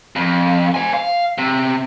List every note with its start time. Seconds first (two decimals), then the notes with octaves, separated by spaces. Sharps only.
0.16 F2
0.74 C5 G#5
0.94 F5
1.38 C3